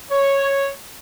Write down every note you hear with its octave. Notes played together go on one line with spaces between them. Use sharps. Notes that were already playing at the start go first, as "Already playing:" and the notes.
C#5